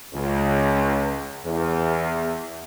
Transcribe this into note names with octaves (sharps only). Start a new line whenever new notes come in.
C#2
E2